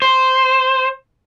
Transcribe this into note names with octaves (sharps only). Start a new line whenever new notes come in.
C5